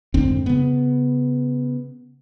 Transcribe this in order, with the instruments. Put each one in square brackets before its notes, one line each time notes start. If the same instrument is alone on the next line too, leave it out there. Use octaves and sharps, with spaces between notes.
[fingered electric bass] F2 G#2 D3 C4
C#3 B3